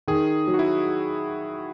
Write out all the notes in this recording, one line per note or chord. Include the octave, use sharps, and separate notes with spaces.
D#3 G#4
F#3
F#4
E4